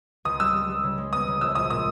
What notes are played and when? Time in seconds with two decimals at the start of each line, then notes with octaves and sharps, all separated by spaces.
0.25 C#2 D#6
0.40 G3 E6
0.54 G3
0.69 G3
0.83 C#3
0.98 G#3
1.12 B3 D#6
1.27 C#3
1.41 A#1 E6
1.55 A#1 D#6
1.70 A#2 D#6